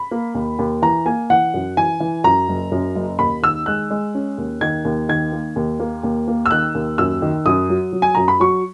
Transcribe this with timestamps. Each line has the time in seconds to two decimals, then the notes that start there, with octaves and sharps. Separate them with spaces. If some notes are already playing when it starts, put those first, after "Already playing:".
Already playing: B5
0.11 A#3
0.35 D#2
0.59 D#2
0.82 E3 A#5
1.06 A#3 G#5
1.30 E3 F#5
1.54 F#2
1.77 E3 G#5
2.00 E3
2.24 F#2 A#5
2.48 F#1
2.72 F#2
2.95 F#1
3.19 D#2 B5
3.42 D#3 E6
3.66 G#3 F#6
3.91 G#3
4.15 C#4
4.38 D#2
4.61 D#3 G#6
4.85 D#2
5.09 D#3 G#6
5.32 A#3
5.56 D#2
5.80 A#3
6.03 D#2
6.28 A#3
6.46 E6
6.51 D#3 F#6
6.75 D#2
6.98 F#2 E6
7.22 D#3
7.46 F#2 D#6
7.69 F#3
7.93 F#3
8.02 G#5
8.15 F#2 A#5
8.28 B5
8.40 F#3 C#6